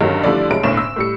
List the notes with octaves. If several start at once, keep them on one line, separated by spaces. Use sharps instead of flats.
G2 D3 D#3 F#3 C#4
D3 F3 G3 A3 E4 D5
F1 C2 F#3 G#3 D7
F#1 B1 A2 D3 C#4 E7
E6
A2 G3 C#7